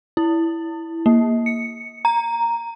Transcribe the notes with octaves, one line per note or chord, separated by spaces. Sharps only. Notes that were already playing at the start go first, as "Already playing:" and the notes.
E4
A#3
C#7
A#5